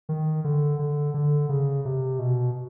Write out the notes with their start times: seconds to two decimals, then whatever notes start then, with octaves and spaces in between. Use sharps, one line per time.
0.09 D#3
0.44 D3
0.79 D3
1.14 D3
1.49 C#3
1.85 C3
2.19 B2